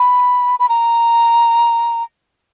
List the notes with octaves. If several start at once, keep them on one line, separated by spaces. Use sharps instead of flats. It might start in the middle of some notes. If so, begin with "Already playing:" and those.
Already playing: B5
B5
A#5